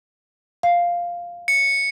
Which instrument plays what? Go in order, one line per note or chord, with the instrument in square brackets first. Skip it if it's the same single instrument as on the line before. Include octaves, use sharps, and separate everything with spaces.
[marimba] F5
[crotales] C#7